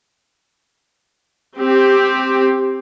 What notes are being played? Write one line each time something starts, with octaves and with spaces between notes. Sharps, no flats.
C4 G4